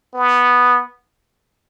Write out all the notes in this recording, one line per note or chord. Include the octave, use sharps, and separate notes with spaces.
B3